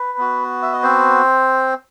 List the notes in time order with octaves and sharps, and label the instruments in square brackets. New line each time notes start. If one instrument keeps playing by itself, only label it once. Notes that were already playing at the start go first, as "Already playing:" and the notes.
Already playing: [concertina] B4
B3 F#4
E5
D#5
C4 C5